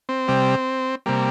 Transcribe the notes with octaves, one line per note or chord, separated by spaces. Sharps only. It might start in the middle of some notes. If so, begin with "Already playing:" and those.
C4
C3 G3
C3 G3 A#3